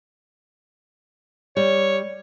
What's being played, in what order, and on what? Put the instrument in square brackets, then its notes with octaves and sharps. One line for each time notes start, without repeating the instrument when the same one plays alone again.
[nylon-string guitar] G3 [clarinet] C#5